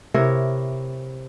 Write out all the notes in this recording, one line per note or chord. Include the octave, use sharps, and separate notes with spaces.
C3 E4 A#4 C#5